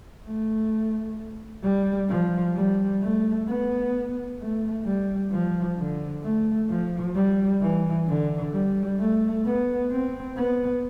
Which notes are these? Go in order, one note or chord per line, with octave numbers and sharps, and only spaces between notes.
A3
G3
F3
G3
A3
B3
A3
G3
F3
D3
A3
F3
G3
E3
D3
G3
A3
B3
C4
B3